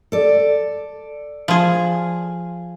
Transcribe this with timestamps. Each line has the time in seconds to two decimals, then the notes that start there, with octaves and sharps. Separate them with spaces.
0.12 A4 D5
1.48 F3 G#4